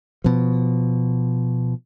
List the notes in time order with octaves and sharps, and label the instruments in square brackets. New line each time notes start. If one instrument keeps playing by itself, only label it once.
[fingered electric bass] B2 F3